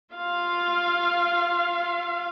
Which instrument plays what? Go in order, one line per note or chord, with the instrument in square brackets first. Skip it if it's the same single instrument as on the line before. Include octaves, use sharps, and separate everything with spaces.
[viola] F4 F5